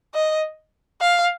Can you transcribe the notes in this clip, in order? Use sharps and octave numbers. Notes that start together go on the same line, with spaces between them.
D#5
F5